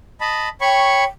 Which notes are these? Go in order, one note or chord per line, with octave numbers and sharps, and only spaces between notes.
D#5 A5 B5
C#5 G5 B5 C#6